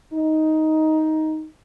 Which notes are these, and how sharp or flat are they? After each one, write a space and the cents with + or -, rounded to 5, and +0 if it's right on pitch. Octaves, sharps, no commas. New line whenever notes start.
D#4 +10